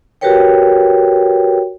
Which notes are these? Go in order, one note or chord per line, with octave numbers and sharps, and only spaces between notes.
F#4 G4 A#4 B4 C#5 G5